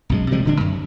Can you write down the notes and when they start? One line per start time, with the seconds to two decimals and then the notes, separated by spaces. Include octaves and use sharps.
0.09 B1 F#2 G#3
0.31 C3 F3 G3 G#3
0.45 D#1 D3 D4
0.60 F#2